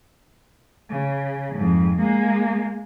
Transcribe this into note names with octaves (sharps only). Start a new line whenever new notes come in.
C#3
F2 G#2
G#3 A#3